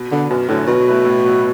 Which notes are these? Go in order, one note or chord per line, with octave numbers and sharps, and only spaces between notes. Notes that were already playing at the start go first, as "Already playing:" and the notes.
Already playing: B2
D3 B3 D4 B4
F#2 B2
A2 D3 F#3
B2 F#3
A3 E4 B4
A2
F#3 B3 E4